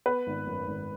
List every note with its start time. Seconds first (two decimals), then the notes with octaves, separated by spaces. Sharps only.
0.06 B3 B4
0.27 G#1
0.47 F#2
0.67 G#1